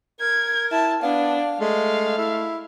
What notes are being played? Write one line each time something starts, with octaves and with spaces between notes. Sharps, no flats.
A#4 G#6
E4 A5
B3 D4 F5
G#3 A3 F5
E4